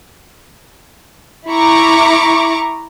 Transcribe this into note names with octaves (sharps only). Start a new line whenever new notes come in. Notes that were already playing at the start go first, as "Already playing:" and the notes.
E4 A#5 C#6 D6